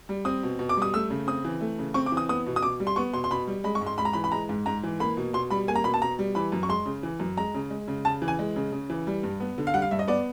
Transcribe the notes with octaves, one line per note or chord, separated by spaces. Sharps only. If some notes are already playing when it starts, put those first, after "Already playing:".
G3
C4 D#6
B2
B2
D6
G3 D#6
A3 E6
C#3
C4 D#6
E3
A3
C#3
C4 C#6
D6
E3
D#6
B3 D#6
B2
D#6
B2 D6
G3
C6
B3 C#6
B2 C6
C6
B2 B5
G3
G#3 B5
C#6
G#2
C6
G#2 B5
A#5
E3 B5
B5
G#3 A#5
G#2
G#2 A#5
E3
A#3 B5
B2
B2 C6
G3 B5
A#3 G#5
A#5
B2 B5
A5
B2 A#5
G3
E3 B5
F#2
C#6
G#3 C6
C#3
E3
F#2
G#3 A#5
C#3
G#3
C#3
C#3 A5
E3
G#5
G#3
C#3
C#3
E3
G3
G2
B3
D3
F5
G3 F#5
F5
G2 E5
D#5
B3 D5